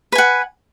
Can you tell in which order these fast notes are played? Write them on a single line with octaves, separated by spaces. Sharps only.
B4 G#5 F#5